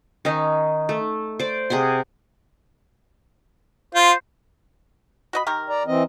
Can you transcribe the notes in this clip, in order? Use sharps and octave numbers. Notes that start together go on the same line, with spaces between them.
D#3 C#4 D#4
A3
C5 D5
C3 G#4 F#5 C6
F4 C5
F#4 D#5 B5
D#3 G4 A#4
D5 A#5
E3 C4 D#5